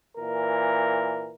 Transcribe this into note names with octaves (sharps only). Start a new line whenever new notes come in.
A#2 E3 A#4